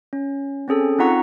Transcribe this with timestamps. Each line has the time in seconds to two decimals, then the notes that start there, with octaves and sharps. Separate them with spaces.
0.13 C#4
0.68 C4 C#4 G#4 A4
0.99 C4 D#4 F4 F#5 A#5 C#6